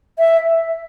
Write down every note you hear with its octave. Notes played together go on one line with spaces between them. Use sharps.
E5